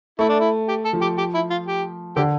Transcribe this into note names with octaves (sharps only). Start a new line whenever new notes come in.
A3 E4
D4
E4
G4
A4
F3
G4
G4
E4
F4
G4
D3 G4